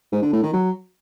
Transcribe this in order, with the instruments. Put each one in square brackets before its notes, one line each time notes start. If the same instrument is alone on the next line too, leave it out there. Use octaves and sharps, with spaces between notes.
[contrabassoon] G#2
D3
A2
D#3
F#3